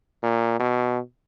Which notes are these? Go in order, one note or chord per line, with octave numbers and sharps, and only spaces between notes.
A#2
B2